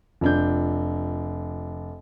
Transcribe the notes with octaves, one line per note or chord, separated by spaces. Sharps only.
F1 D4 G6